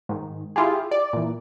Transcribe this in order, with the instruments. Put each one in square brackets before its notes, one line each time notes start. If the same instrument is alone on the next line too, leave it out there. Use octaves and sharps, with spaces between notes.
[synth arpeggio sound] G#2 D#3
E4 F4 G4 G#4
D5
A#2 E3